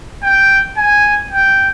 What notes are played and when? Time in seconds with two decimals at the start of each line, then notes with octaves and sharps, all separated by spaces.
0.23 G5
0.77 G#5
1.31 G5